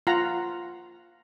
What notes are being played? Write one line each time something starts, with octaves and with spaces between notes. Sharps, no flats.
F4 F#5 A#5